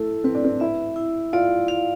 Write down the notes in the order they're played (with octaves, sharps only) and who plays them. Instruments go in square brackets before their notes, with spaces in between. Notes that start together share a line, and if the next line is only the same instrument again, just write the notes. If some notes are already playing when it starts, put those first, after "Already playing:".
Already playing: [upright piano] A3 [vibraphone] E4
[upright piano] C4 [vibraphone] B4
[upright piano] D4
C4
[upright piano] E4 [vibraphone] E5
[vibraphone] E4
[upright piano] F4 [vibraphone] D5
[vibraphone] F5